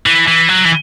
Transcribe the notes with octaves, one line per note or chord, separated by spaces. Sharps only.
E3
E3
F#3
E3